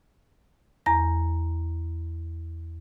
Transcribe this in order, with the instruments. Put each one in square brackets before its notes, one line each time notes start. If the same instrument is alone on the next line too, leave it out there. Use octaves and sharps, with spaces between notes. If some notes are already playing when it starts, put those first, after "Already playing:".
[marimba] E2 A#5 A#6